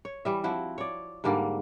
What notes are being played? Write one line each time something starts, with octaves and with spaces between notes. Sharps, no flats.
C#5
E3 G3 E5
F3 C4 E4 F#4
C#5 D5
G#2 D3 G3 A#3